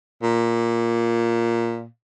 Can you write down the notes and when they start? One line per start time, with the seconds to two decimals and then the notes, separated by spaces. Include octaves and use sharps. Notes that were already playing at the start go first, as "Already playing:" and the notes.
0.23 A#2